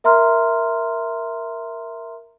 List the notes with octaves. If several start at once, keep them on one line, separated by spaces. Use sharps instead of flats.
A#4 E5 A#5 C6 F6